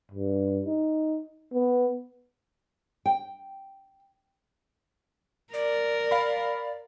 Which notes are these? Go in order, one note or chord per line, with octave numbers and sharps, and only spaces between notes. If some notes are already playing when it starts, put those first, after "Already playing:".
G2
D#4
B3
G5
A#4 D5
F5 B5